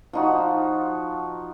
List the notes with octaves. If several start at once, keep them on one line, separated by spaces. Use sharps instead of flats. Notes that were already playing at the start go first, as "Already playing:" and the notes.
F3 D#4 F#4